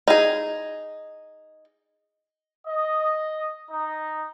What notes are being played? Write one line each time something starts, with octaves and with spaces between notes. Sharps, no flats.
D#4 G#4
D#5
D#4